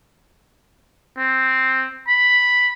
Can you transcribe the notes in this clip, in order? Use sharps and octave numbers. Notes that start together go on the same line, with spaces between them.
C4
B5